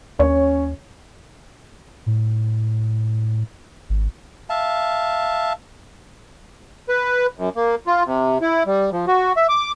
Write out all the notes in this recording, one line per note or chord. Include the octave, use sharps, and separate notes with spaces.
D#2 C#4 C#5
A2
G#1
E5 F5 A5
B4
F#2
A#3
F4
C3
E4
G3
F3
F#4
E5
D6